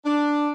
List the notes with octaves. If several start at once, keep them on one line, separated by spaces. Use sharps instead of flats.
D4